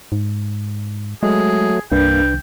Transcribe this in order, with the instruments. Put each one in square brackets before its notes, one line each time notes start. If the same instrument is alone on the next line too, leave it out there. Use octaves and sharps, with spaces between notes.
[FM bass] G#2
[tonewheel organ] F#3 A3 [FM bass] G#3 [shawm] G#4
[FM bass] C2 [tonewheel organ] G2 A#3 [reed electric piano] D4 B4 [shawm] G5